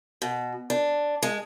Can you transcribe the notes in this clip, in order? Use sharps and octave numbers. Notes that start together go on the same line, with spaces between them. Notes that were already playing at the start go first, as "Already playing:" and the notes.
B2
D4
G#3